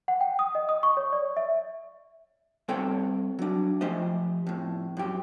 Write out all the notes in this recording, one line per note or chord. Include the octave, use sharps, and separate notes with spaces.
F#5
G5
D#6
D#5
D#6
C#6
C#5
D5
E5
G3 C4 A4 C#5 G5
F#3 D4
F3 A3 G4 C5 D#5
F2 A2
F#2 G4